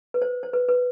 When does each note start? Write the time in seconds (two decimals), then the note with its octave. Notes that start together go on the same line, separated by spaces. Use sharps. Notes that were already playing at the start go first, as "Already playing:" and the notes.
0.14 B4
0.22 C5
0.43 C5
0.53 B4
0.68 B4